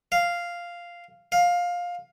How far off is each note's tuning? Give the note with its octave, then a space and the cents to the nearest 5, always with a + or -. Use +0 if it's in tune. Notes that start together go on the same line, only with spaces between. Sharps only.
F5 -5
F5 +15